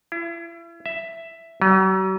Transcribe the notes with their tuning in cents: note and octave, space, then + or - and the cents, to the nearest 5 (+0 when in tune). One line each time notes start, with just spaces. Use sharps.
E4 +40
E5 +5
F#3 +45